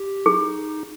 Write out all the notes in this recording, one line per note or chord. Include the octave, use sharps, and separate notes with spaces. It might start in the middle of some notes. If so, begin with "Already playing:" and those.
Already playing: G4
D#4 G#4